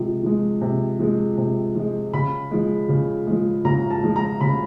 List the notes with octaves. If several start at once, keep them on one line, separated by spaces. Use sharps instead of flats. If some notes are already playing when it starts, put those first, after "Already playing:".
Already playing: C3 F3 G#3
F3 G#3
C3
F3 G#3
C3
F3 G#3
C#3 B5
F3 G#3
C#3
F3 G#3
C#3 A#5
A5
F3 G#3
A#5
C#3 B5